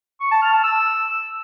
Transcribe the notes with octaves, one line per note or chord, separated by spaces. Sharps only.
C#6
A5
F6
A5
E6